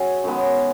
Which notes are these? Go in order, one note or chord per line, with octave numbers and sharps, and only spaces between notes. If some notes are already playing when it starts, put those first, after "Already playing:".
Already playing: F#3 C#4 G#4
F#2 D#3 G#3 B3